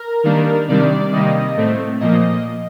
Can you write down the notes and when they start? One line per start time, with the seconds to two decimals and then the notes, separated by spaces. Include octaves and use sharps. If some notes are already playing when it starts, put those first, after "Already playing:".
Already playing: A#4
0.24 D#3 G3 A#3 D4
0.68 C3 D#3 G3 D4 D5
1.13 C3 D#3 G3 A#3 D#5
1.57 A2 A3 C4
2.00 A#2 F3 A#3 D#5